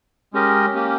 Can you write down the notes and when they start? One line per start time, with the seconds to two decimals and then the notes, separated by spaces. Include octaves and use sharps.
0.33 G#3 C#4 G4 A#4 D#5
0.74 A#3 C#4 G4